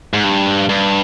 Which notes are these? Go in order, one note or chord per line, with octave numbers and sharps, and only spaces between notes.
G#2
G2
G2